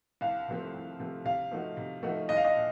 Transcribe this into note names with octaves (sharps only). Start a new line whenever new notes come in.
C2 F5
C3 F3 A3 C4
C2
C3 F3 A3 C4
C3 F5
F3 A3 D#4 F#4
C3
F3 A3 D#4 F#4
C2 D#5
F5
D#5
A#2